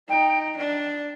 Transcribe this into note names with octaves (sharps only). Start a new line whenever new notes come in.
D#4 G5
D4